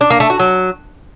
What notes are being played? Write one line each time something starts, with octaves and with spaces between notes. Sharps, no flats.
D4
A#3
A3
F#4
F#3